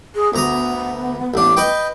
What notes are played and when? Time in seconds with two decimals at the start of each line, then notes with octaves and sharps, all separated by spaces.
0.15 G#4
0.34 D2 B3 A#5 D#6
1.34 A1 D4
1.57 B4 D#5 G5